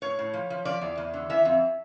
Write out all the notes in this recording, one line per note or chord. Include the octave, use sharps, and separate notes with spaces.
A2 C#5
A2
F3
F3
F3 D5
E2
E2
D3
E3 E5
F2